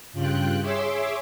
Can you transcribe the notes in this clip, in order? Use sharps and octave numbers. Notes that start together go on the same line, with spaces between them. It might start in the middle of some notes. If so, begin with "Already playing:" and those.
G2 C#3 F4 G5 F#6
G#4 C#5 E5 C6 D6 E6